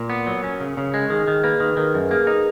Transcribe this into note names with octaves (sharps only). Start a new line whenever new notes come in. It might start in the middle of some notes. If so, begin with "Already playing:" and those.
Already playing: A#2 A#4
B3
F#3
C#4
C#3
C#3
G#3
D#3 G#4
D#3
A#3 B4
D#3
D#3 A#4
F#2
A#3 G#4
D#4